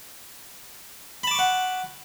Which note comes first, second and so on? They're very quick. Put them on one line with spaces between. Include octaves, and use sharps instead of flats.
B5 A5 D6 C#6 F#5